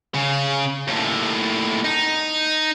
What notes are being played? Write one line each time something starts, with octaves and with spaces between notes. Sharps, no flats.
C#3
D#2 A2
D#4